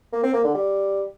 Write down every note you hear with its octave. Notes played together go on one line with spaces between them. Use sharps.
A#3
C4
A#3
D3
G3